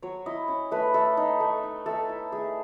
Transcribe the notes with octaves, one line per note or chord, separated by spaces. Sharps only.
F#3 C#5
E4 D#5
C#4
A3 B4
A3 A4
D#4
A3
D#4
A3 A4
E4
A3 G#4